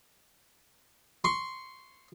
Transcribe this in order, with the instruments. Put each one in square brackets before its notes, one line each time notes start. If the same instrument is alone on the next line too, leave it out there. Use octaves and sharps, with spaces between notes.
[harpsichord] C6 C#6